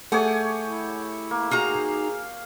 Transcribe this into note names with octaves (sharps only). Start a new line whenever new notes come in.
A3 G4 G#4 C#5 F#5 G#5
E4
A#3
D#4 F#4 G#4 F5 A#5